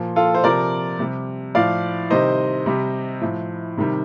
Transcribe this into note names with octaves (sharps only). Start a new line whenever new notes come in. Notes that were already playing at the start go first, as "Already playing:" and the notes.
Already playing: A#2 F3
F4 A4
C5
C3 F3 A#4 D5
C3 G3
A2 F3 D5 F5
C3 D#3 G3 C5 D#5
C3 G3
A2 F3
C3 D#3 G3